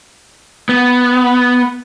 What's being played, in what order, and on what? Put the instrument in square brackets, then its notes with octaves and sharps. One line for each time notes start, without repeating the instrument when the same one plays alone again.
[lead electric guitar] B3